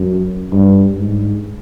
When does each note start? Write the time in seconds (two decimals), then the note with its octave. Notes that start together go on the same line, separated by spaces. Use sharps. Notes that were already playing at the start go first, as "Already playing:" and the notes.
Already playing: F#2
0.52 G2
0.97 G#2